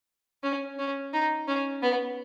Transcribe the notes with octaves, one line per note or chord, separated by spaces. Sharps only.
C#4
C#4
D#4
C#4
B3